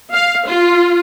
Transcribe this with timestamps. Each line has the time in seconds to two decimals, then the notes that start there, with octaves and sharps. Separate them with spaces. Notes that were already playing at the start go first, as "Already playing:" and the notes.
0.13 F5
0.47 F4